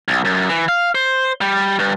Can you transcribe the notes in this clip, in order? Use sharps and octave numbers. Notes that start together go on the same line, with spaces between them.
B1
F#2
E3
F5
C5
G3
G2